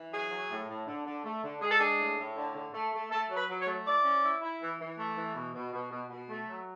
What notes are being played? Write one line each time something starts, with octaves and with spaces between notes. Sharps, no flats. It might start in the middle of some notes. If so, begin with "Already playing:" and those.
Already playing: E3
F#3 G#4
F#3
A2
A2
D3
D3
A3
D3
G#3 G#4
A4
D4 G#4
A2
A2
D3
D3
A3
A3
A3 A4
F#3
B4
F#3
C#5
A3
E4 D5
C#4
E4
E4
E3
E3
A3
E3
B2
B2
B2
B2
B2
A3
F#3